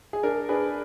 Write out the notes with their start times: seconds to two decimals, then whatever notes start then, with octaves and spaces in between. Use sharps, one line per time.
0.13 G#4
0.23 D4 A#4
0.49 D4 G#4 B4